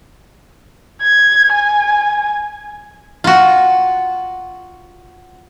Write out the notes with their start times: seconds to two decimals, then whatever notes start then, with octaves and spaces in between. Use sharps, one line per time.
1.02 G#6
1.52 G#5
3.24 F4 F#4